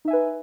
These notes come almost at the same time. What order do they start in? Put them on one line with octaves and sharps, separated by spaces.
D#4 E5 G#5 B4